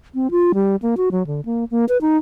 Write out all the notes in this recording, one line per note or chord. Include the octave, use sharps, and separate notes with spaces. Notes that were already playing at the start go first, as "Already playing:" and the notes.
C4
F4
G3
A#3
F#4
F#3
D3
A#3
A#3
B4
D#4